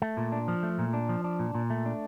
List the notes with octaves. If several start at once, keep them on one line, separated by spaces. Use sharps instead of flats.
A3
A#2
D4
F3
A3
A#2
D4
F3
D4
A#2
A#2
A3
D4